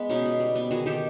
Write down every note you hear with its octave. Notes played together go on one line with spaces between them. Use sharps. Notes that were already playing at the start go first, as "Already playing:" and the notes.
Already playing: G#3 B3
B2 C#4 D#4
B2
G3
B3
D#3 F#4 G#4
D#3 G4 A4